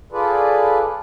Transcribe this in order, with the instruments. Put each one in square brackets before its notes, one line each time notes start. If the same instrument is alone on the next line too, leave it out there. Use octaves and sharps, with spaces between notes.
[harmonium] F4 G#4 A4 B4 D5